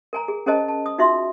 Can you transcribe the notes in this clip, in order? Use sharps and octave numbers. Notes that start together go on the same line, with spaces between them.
A#4 G#5 A#5
G#4
C#4 G#4 A#4 C5 D#5 A5
A5
D#6
D#4 F4 F#4 E5 C6 C#6